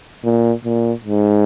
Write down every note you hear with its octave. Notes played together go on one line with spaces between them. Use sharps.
A#2
A#2
G#2